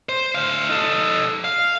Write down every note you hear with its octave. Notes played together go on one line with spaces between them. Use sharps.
C5
D2 F5
D#4 A4
F5